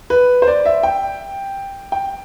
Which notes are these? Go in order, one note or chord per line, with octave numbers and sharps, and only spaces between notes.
B4
C5
D5
E5
G5
G5